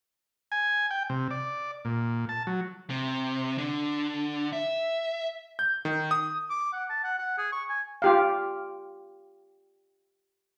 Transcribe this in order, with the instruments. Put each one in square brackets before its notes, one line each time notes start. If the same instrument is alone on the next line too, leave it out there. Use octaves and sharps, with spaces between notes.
[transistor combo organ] G#5
G5
C3
D5
A#2
A5
F#3
[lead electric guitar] C3
D3
E5
[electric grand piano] G6
D#3
D#6
[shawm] D6
F#5
A5
F#5
F#5
G#4
C#6
G#5
[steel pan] F4 G4 F5